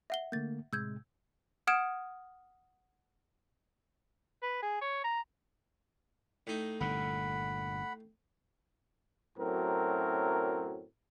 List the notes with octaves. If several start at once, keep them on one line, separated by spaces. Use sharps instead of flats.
E5 F#5 G7
D3 A3 A#3 G6 A6
A2 C3 G#3 E6 G6 G#6
F#5 D#6 F6 G#6 D7 E7
B4
G#4
C#5
A#5
A2 D#4
G1 A#2 D3 F#5 B5
F#2 A2 F#3 C4 A#4